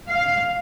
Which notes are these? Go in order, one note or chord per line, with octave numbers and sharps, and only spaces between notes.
F5